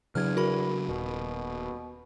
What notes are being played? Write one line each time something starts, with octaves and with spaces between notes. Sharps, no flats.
E2 C#3 F#3 D4 F6 G#6
F#4 A#4 B5
D#1 B2